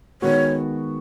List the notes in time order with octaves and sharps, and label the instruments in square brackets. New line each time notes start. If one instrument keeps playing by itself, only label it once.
[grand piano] D#3 G#3 B3 F#4 [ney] C#5